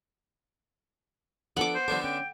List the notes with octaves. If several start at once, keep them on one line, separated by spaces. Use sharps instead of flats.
F3 B3 D4 A4 F#5 D6
C5
D3 F3 G3 B3 D4 A4
C#4 G5